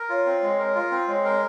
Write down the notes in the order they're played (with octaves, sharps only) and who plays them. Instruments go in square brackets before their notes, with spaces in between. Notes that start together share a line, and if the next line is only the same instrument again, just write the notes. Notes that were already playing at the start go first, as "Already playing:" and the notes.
Already playing: [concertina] A#4
[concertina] F4 [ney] C#5
[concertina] C4
G#3
A#4
F4
C4
[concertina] G#3 [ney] C#5
[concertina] A#4